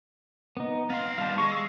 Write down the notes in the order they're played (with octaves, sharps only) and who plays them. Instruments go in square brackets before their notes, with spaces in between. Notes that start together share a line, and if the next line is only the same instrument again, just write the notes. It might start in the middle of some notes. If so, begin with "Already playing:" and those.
[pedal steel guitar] B3 D#4
[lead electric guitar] B3 C6 [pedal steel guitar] F5
[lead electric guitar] D#3 G3 [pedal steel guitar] F5 A5
[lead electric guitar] G#3 [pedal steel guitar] C#6
[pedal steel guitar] E6